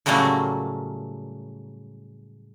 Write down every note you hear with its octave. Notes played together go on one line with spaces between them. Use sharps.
A2 C#3 F#3 G3 A3 A#3